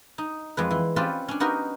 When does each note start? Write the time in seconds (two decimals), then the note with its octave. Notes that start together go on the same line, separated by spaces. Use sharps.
0.18 D#4
0.57 F2 G#3 B4
0.71 E3
0.96 C4 C#4 F4 G4 B4 D5
1.28 C#4 D4
1.40 B3 D#4 F#4 G4 A#4